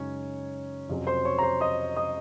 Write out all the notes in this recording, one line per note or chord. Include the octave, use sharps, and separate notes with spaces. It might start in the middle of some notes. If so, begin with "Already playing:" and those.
Already playing: F#2 C#3 G#3 C#4 D#4 C#5
F2 C3 F#3 C#4
C5 C6
C#5 C#6
A#5
C5 C6
D#5 D#6
D#5 D#6